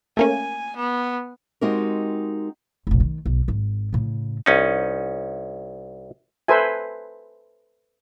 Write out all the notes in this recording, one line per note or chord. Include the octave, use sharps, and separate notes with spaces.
A3 A#3 C#4 G#5
B3
G#3 C4 D#4 F#4 G4 A#4
F1 A#1
D#3
B1
G#1
A2 C#3
C2 C#4 D#4
A4 B4 C5 E5 G#5